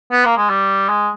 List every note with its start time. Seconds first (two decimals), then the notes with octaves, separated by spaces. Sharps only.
0.12 B3
0.25 A#3
0.37 G#3
0.50 G3
0.89 G#3